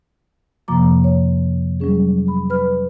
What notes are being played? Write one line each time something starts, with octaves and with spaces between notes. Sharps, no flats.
F2 C3 F3 A#3 A#5 D6
C#5
F#3 G3 C#4 G#4
B5
B4 B5 F6